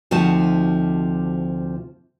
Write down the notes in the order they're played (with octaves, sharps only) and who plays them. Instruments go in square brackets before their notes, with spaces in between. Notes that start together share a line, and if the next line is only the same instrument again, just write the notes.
[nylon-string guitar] D2 C3 F3 D#4 F#4 A5